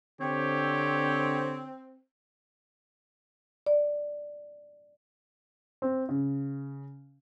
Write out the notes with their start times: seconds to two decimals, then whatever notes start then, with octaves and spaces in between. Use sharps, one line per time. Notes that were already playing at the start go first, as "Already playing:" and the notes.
0.21 D3 C4 G4 C#5
3.67 D5
5.82 C4
6.09 C#3